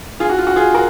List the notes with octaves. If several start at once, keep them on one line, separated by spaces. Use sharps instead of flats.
F4 G#4
F#4
F4
F#4
F4 G#4
F#4 A#4